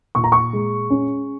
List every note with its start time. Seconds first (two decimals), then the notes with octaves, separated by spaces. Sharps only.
0.15 A#2 C#6
0.24 A#5
0.32 C#6
0.53 G#3
0.90 C#4